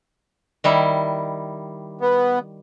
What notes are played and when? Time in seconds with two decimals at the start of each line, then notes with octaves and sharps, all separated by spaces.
0.64 D#3 G3 E4
2.01 B3